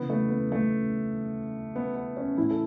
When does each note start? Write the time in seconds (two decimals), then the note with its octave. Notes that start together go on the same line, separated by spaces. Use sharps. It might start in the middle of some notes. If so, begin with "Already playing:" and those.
Already playing: C#3 E3 B3
0.10 A3
0.30 B3
0.52 A3
1.76 B3
1.96 B3
2.17 C#4
2.37 A2 E3 E4
2.51 A4